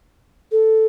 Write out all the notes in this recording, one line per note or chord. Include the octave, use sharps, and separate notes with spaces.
A4